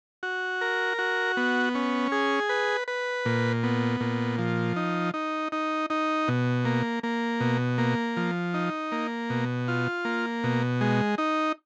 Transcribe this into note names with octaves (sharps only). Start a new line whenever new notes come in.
F#4
A#4
F#4
B3
C#4
G#4
B4
B4
A#2
B3
A#2
F3
D#4
D#4
D#4
D#4
B2
A#3
A#3
B2
A#3
F3
D#4
A#3
B2
F4
A#3
B2
G#3
D#4